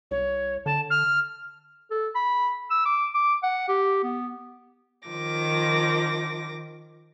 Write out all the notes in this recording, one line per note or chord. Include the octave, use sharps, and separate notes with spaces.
C2 C#5
D3 A5
F6
A4
B5
E6
D6
D6
F#5
G4
B3
D#3 F3 D6 A#6